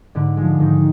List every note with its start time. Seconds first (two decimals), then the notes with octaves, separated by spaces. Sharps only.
0.15 G#2 D3 D4
0.37 F3 G#3
0.60 G#2 D#3 D#4